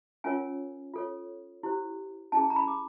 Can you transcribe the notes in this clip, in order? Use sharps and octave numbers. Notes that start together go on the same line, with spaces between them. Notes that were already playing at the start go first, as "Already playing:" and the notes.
C#4 F4 A#4 C#5 G#5
F4 A4 C#5
E4 G4 C5
C#4 E4 G#4 A5
A#5
B5
D6